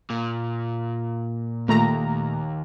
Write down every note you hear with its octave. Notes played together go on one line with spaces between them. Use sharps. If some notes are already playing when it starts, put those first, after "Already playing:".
A#2
D#2 A#2 A3 A#5